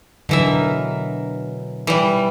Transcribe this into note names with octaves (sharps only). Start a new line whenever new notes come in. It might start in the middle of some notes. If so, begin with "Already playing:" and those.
B2 D3 E3 F#3 E5
A#4
E3 G3